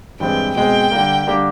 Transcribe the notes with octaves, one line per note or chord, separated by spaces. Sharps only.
G2 E3 G#3 C4 G5
B2 G#3 C4 G5
D3 G3 A#3
D3 G3 A#3 D4 G4